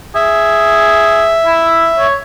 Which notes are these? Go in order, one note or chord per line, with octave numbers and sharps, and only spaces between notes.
G#4 E5
E4
C#5